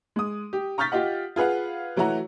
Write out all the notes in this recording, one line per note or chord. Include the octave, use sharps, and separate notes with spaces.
G#3 D#6
G4
A#5 C#6 F6 G6 A6 B6
F4 G4 D#5 F#5
F4 G#4 B4 F5 F#5
E3 F#3 A3 F#4 A#5